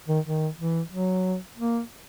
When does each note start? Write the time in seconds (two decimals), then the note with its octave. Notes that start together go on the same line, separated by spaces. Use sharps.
0.08 D#3
0.25 D#3
0.58 E3
0.91 F#3
1.57 A#3